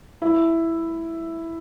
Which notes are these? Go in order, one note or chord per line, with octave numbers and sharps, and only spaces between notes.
E4